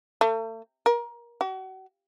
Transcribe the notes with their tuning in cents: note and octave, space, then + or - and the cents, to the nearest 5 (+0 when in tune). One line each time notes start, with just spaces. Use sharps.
A3 +40
A#4 +25
F#4 +35